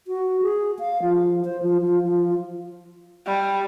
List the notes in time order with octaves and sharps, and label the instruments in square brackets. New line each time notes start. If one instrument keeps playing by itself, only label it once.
[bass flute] F#4
G#4
F5
F3
C5
F3
F3
F3
[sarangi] G3